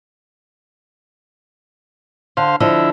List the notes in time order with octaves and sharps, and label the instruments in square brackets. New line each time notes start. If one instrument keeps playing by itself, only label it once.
[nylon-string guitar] D3 [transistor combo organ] C5 F5
[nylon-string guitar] D3 F3 D#5 [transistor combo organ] E4